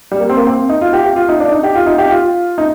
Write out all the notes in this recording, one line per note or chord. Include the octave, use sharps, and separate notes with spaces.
G3
A#3
C4
A#3
C4
D#4
F4
G4
G4
F4
D#4
D4
D#4
G4
F4
D#4
G4
F4
D#4